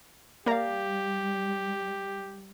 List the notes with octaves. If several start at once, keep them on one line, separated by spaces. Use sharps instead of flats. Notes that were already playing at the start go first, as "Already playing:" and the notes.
G3 A#3 G4 A#4 D5 F5 A#5